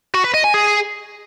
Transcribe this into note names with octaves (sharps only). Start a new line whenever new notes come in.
F#4
B4
D#5
G#5
G#4